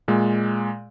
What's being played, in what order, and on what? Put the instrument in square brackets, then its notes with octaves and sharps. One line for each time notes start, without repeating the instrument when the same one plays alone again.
[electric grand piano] A#2 G#3